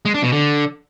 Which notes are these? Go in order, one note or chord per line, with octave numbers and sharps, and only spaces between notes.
G#3
D4
B2
D3